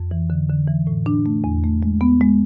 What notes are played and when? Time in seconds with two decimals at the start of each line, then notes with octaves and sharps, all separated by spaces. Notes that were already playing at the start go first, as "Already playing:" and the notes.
Already playing: F2
0.11 E3
0.30 D3
0.50 D3
0.68 E3
0.87 A2
1.06 D4
1.26 A3
1.44 E2
1.64 A3
1.83 G#3
2.01 B3
2.21 G#3